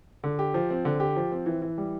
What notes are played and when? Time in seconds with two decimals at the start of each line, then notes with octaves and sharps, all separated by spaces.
0.24 D3
0.39 G4
0.54 F3
0.70 C4
0.85 D3
1.00 G4
1.16 F3
1.32 C4
1.46 E3
1.62 E3
1.78 G3